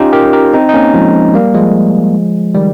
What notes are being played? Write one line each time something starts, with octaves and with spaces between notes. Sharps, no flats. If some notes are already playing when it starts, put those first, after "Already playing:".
Already playing: C#4 D#4 F4 G4
G4 A#4
G4 A#4
C4 D#4
D#4
A#3 C#4
F3 G#3
G3 A#3
F3 G#3
D#3 G3